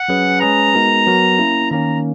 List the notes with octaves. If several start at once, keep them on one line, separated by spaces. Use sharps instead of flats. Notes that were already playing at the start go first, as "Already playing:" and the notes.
Already playing: F#5
F#3 C#4 G#4 B4
G#3 C#4 G#4 B4 A#5
G#3 B3 D#4 F#4 A#4
F#3 B3 F#4 A#4
A#3 C#4 E4
D#3 A#3 C#4 A#5